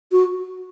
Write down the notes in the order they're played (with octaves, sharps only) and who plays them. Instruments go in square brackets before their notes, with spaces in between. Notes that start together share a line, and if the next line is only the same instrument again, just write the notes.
[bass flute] F#4